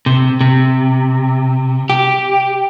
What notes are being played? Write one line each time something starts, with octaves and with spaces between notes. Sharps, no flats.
C3
C3
G4